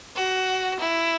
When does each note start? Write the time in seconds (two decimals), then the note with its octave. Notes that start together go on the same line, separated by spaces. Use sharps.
0.16 F#4
0.79 E4